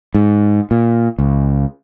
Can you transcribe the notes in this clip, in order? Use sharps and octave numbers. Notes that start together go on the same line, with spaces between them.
G#2
A#2
C#2